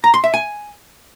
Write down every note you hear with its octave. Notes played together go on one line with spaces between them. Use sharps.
A#5
C6
E5
G#5